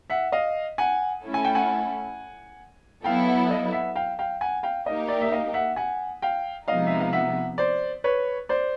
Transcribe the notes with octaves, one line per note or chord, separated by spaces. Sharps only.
E5 F#5
D#5 F5
F#5 G#5
A3 C#4 E4 A4
G#5
G5
F#5 G#5
F#3 B3 E4 A4 F5 G5
E5 F#5
D#5 F5
E5 F#5
F5 G5
F5 G5
F#5 G#5
F5 G5
A#3 D#4 G4 A#4 D#5 F5
D5 E5
E5
D#5 F5
E5 F#5
F#5 G#5
F5 G5
C3 F3 G#3 B3 D#4 D#5 F5
E5
F5
E5 F#5
C5 D5
B4 C#5
C5 D5